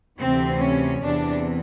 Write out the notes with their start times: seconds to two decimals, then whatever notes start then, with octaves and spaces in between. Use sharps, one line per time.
0.18 D2 C3 E3 C4
0.60 C#4
1.02 E2 C3 E3 D4